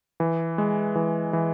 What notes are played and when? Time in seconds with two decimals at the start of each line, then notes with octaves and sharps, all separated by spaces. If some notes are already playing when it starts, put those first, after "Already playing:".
0.20 E3
0.58 G#3
0.95 E3
1.33 E3